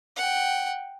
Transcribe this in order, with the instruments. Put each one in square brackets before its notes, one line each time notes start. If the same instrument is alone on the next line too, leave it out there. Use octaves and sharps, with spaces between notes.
[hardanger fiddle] F#5 G5